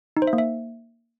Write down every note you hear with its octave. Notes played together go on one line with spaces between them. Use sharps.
D#4
C5
E5
A#3
E5